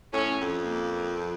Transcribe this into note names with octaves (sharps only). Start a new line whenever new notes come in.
A2 C#4
F2
A#3